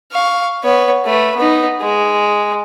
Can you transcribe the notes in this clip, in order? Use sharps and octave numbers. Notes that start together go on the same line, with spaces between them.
F5 C#6
B3 C#5
A3 B4
B3 D#4
G#3